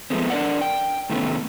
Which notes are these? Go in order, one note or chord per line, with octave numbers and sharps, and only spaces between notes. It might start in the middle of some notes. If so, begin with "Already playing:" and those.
F3 G#3 A3 B3 C4
D4 A#4 D5 F#5
G5
A2 C3 D#3 A3 B3 C#4